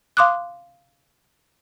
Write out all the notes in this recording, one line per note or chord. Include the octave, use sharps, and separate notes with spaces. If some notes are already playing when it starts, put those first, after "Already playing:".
F5 C6 D6 D#6 F#6